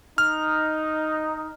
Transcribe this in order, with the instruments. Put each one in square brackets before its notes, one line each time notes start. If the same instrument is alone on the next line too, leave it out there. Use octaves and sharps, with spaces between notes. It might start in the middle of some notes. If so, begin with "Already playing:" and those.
[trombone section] D#4 [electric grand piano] F6